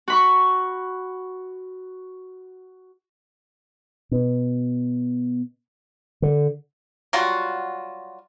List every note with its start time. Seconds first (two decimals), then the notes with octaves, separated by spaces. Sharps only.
0.08 F#4 B5 C#6
4.11 B2
6.22 D3
7.13 F#3 G3 F4 F#4